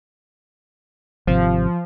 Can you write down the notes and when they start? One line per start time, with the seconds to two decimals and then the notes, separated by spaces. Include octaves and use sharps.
1.27 G#1 C3 F3